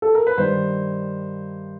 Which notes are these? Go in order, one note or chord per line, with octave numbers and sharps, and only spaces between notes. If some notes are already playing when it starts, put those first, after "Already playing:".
A4
A#4
B4
G2 D#3 G3 C5